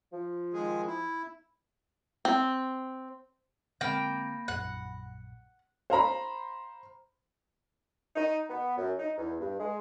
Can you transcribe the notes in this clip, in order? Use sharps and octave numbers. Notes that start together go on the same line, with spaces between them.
F3
D#3 G#3 G#4
E4
C4
D3 G#3 A#3 C4 G5 B5 A#6
A#1 F#2 F#5
C5 F5 A#5 B5
D#4
B3
F#2
D#4
E2
G2
G#3